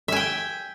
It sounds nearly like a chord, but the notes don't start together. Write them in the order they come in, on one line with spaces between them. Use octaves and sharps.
E5 G#5 G5